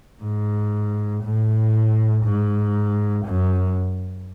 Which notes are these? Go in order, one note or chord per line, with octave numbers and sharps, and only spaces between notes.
G#2
A2
G#2
F#2